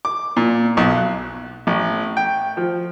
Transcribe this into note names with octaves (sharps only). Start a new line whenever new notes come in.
D6
A#2
B1
F#6
A1
G5
F3